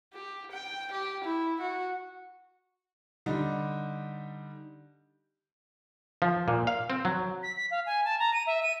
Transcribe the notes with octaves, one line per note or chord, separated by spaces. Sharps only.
G4
G5
G4
E4
F#4
D3 G3 D#4
F3
A#2
F5
C4
F#3
B6
B6
F5
G#5
A5
A#5
D#7
E5
D#7